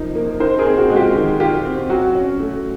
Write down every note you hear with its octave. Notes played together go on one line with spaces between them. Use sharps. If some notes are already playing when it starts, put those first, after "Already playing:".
Already playing: C3 F3 A#3 D#4
A#3
D#4 A#4 C5
G#4 A#4
C4
F#4
G#3
F4 G4
D#3
D#4 F4 G4
C4
F#3 F#4
C#4
A3